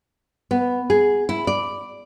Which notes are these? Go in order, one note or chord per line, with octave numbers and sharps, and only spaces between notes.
B3
G#4
E4
D5